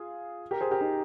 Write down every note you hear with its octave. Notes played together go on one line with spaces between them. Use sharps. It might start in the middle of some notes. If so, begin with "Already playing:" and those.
Already playing: F4 G#4
G4 A#4
G#4 C5
G4 A#4
D#4